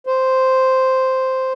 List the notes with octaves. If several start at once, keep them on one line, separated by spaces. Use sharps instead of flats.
C5